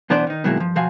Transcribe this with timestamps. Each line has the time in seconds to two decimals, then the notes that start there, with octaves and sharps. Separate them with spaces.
0.10 B1 E3 B3 D4 C5 D5
0.27 D#3 D#4
0.44 B2 D#3 F#3 G#3 A#3 E4
0.57 G2 F3
0.76 B1 F3 F#4 F5 G#5